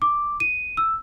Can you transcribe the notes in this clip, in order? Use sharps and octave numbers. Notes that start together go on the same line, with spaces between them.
D6
D#7
E6